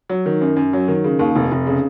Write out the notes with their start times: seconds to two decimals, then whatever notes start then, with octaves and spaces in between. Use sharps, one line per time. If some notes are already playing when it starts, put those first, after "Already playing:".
0.09 F#3
0.26 D#3
0.41 F#2
0.57 F#2
0.73 F#3
0.88 D#3
1.04 C#3
1.19 D#2
1.36 F1
1.52 F1
1.67 C#3